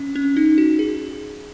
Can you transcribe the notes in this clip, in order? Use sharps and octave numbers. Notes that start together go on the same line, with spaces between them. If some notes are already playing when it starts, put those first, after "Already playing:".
Already playing: C#4
C#4
D#4
F#4
G#4